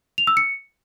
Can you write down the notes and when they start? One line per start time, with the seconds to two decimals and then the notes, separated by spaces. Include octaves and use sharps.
0.18 F7
0.27 E6
0.37 C#7